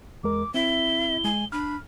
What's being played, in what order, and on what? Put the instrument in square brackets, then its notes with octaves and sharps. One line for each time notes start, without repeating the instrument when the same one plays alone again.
[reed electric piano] E2 G#3 A#4 [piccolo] D6
[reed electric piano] C4 [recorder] E4 [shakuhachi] E5 [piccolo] G7
[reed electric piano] G#3 [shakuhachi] G#5
[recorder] D4 [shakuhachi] B5 [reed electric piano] F6